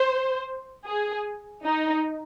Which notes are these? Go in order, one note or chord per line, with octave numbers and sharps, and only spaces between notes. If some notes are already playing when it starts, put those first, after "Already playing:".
Already playing: C5
G#4
D#4